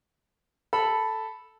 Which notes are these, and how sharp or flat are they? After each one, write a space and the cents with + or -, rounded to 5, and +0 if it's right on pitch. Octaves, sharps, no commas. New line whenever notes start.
A4 +0 B5 +0